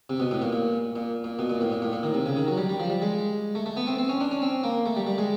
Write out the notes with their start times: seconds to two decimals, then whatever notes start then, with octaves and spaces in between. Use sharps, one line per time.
0.10 C3
0.20 B2
0.31 A2
0.42 A#2
0.52 A#2
0.96 A#2
1.24 A#2
1.39 B2
1.50 A#2
1.61 A2
1.72 A#2
1.82 A2
1.93 A#2
2.03 D#3
2.14 C3
2.26 C#3
2.37 D#3
2.48 F#3
2.57 G3
2.69 G3
2.80 F3
2.90 G3
3.02 G#3
3.55 A3
3.66 A3
3.77 B3
3.87 C4
3.98 C4
4.09 C#4
4.21 D4
4.31 C#4
4.42 C4
4.63 A#3
4.86 A3
4.96 G3
5.07 G3
5.18 G#3